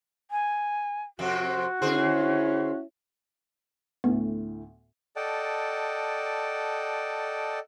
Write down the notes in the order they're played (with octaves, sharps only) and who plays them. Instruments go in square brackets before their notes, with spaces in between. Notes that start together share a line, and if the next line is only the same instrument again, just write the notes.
[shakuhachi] G#5
[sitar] F2 C3 C4 [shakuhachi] F#4
[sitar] D3 G#4 C5 [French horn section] C#4 E4
[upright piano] D2 A2 [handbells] B3
[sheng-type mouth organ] A4 D5 D#5 F#5 G5 A5